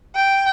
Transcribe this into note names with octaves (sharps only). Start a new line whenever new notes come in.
G5